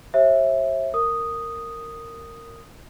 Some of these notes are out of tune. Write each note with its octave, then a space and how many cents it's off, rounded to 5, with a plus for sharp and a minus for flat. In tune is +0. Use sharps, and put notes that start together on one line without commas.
G4 +0 C5 +45 E5 +0
A#4 -15 D#6 -5